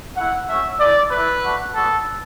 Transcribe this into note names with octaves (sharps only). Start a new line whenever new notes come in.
A3 E4 F#5
A3 C#4 F#4 E5
A3 E4 D5
A3 E4 B4
A3 D4 F#4
B3 D4 F#4 A4